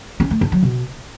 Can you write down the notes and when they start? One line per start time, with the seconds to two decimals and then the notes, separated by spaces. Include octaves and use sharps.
0.20 C#4
0.31 A3
0.41 D4
0.52 F#3
0.63 B2